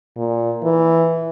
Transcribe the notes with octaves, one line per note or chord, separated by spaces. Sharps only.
A#2
E3